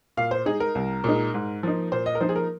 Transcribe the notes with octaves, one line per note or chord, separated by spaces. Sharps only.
A#2 F5
C5
G#3 D#4 G#4
A#4
C2
A#2 G#3 D#4
G#2
F3 A#3 D#4
A#2 C5
D#5
A#4
F3 A#3 D#4 C5
G#4
A#4